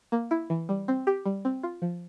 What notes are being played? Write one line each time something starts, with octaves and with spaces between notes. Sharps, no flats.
A#3
E4
E3
G3
C4
G4
G3
C4
F4
F3